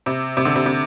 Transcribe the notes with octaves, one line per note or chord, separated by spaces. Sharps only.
C3
C3
D3
C3
C3